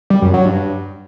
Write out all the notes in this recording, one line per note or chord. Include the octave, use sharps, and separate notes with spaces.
G3
F#2
F#3
G2